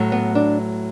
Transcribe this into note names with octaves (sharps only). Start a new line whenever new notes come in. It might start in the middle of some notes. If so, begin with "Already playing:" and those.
Already playing: A2 F#3 A3
B3
D4